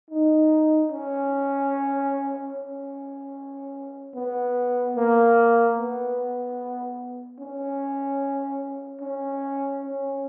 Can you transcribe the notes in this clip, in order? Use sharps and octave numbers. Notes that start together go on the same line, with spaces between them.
D#4
C#4
C#4
B3
A#3
B3
C#4
C#4
C#4